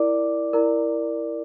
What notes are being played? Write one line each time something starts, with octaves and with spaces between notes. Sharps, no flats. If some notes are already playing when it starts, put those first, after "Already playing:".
Already playing: E4 A#4 D5 D6
E4 A#4 D5